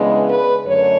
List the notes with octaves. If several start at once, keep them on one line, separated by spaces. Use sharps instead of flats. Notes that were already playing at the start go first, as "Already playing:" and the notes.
Already playing: C#3 E3 G#3 B3 D4
B4
F#2 D3 A3 C#5